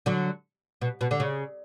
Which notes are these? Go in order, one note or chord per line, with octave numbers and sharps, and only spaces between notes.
D3 F#3
B2
B2
D3
C#3